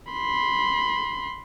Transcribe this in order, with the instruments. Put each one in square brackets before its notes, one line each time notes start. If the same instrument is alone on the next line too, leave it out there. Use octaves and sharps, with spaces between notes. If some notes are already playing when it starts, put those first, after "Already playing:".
[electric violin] B5 C6